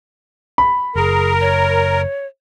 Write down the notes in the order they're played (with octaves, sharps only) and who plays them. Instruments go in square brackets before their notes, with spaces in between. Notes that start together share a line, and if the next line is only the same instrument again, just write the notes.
[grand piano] B5
[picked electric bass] F#1 [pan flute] G#4 [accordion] A#4
[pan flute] C#5